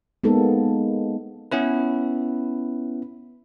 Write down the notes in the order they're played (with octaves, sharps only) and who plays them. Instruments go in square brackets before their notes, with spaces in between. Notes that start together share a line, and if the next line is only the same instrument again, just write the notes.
[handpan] G#3 A#3 B3 D#4 A4
[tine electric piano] B3 C#4 E4 B4